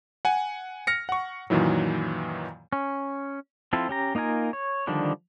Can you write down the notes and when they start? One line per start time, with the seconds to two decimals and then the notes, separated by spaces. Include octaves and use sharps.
0.25 F#5 G#5
0.87 F6 A#6 C#7
1.09 F#5 C#6
1.50 F#2 A#2 D#3 E3 F#3
2.73 C#4
3.73 F3 C4 E4 F4 A4
3.89 C#4 G4 A#5
4.15 A#3 D#4 F4 A#4 G#5
4.53 C#5
4.87 D3 D#3 F3 G3 D4